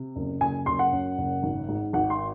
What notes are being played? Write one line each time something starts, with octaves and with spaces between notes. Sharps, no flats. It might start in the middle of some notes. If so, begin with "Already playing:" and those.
Already playing: C3
F#1
F#1 G#5
F#1 C6
F#5
F#2
F#1
G#1
G#2
G#1 F#5
C6